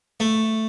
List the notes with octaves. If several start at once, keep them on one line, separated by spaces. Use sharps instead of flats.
A3